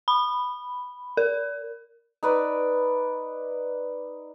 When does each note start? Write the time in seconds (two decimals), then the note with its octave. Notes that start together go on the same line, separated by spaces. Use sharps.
0.08 B5
1.17 A#4
2.23 D#4 B4 D5